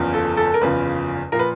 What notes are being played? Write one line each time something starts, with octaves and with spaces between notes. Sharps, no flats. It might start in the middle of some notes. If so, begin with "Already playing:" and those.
Already playing: F#1 E2 C#3 F3
A4
A4
A#4
F#1 E2 C#3 F3 B4
A#2 F3 A#3 A#4
B4